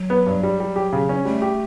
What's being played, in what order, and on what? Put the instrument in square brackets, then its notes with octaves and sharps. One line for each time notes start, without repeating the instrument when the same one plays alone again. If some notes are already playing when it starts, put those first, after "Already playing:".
Already playing: [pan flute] F#3
[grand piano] B3
G2
G3
G3
G4
C#3
C#4
[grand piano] G3 [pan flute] A3
[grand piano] G4